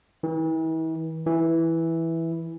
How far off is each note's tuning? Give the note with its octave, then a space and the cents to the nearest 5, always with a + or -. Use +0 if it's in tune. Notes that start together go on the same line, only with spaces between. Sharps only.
E3 -40
E3 -5